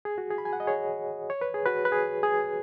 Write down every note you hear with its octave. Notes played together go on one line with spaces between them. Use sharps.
G#4
F#4
G#4
B5
G#5
F#5
D#5
G#4 C#5
C#5
B4
G#4
F#4 B4
B4
G#4
G#4